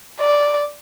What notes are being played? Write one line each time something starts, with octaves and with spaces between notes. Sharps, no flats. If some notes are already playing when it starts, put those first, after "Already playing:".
D5